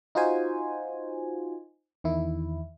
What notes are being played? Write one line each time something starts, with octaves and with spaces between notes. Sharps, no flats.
D#4 F4 F#4 C5 G#5
E2 D#3 E4